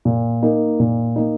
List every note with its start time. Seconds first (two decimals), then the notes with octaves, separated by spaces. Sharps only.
0.05 A#2
0.43 A#3 D#4
0.80 A#2
1.16 A#3 D#4